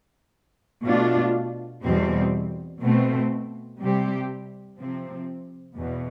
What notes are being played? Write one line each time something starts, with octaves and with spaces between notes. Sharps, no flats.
B2 A3 D4 F4
E2 B2 G3 C4
B2 A3 C4
C3 G3 C4 G4
C3 F3 C4
E2 B2